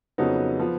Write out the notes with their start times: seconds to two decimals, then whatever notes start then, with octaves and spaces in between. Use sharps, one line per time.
0.18 F2 C#3 F#3 B3 D#4
0.60 F3 B3